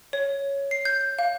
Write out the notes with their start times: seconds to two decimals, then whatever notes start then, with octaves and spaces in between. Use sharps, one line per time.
0.13 C#5
0.71 C7
0.85 G6
1.19 F5